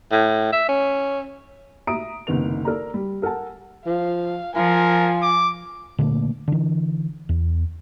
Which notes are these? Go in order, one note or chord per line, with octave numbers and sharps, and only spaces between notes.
A2
E5
C#4
E5 A#5 D#6 D7
F#1 C2 D#3 B3 F7
A4 A#4 D5 A#5
G3
A4 A#4 F#5 G#5 A5
F3 F5
F3 F4 A#4 G#5
D6
A#2 D3 A3 A#3
D3 E3
E2